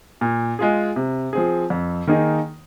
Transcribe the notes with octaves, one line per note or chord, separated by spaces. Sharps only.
A#2
G#3 F4 G#4
C3
F3 C4 G#4
F2
D#3 A#3 D#4 G#4